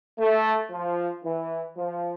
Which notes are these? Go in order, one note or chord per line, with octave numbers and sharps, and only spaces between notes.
A3
F3
E3
F3